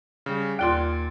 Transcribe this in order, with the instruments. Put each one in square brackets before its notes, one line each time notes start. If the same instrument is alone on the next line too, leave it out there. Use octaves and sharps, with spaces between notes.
[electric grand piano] C#3 G3
[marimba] D#2 F4 C6 [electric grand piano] A#2 D5 D7